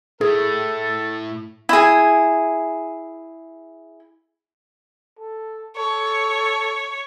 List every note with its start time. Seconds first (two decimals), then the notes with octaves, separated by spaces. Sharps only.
0.21 A2 E4 G#4 A4
1.69 E4 G#4
5.18 A4
5.76 A4 C#5